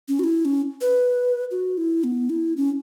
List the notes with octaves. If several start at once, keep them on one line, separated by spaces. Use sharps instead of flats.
C#4
F#4
E4
C#4
B4
F#4
E4
B3
E4
C#4